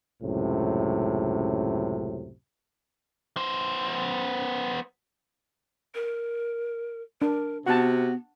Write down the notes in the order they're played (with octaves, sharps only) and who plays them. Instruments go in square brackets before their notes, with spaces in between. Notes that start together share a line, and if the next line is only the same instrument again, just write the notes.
[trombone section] C#2 F#2 A2 C3
[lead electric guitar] B3 C5
[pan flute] A#4
[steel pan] D4 [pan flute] A#4
[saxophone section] C3 F#4 [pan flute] B3 [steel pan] F#5 A5